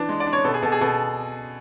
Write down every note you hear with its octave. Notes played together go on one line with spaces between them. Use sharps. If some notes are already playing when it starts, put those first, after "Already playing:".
Already playing: E3 D4
G#3
D5
D4
C#5
B2 A4
G#4
B2 A4
G#4
B2 A4